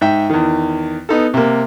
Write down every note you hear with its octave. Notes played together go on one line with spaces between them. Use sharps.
G#2 E5 G5
E2 D#3
B3 D#4 A4
C3 A#3